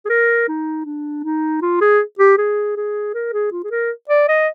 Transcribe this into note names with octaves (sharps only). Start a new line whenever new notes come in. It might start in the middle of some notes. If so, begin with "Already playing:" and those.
G#4
A#4
D#4
D4
D#4
F4
G#4
G4
G#4
G#4
A#4
G#4
F4
G#4
A#4
D5
D#5